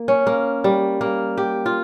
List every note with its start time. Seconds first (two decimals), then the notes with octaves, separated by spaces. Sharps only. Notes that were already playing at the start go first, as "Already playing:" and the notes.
Already playing: A#3
0.08 C#4
0.27 A#3
0.64 G3
1.01 A#3
1.38 G4
1.66 F4